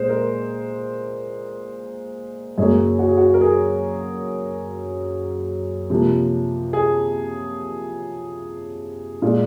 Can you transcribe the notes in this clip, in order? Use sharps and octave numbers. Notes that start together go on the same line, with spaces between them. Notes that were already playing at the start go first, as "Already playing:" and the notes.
Already playing: A#2 G#3 C5
A#4
F#2 C#3 F#3 A#3 G#4
F#4
G#4
F#4
A#4
G#4
C3 F3 A#3
G#4
A#2 G#3